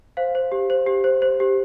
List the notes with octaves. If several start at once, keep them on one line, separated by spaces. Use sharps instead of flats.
C5 F5
C5
G4
C5
G4
C5
C5
G4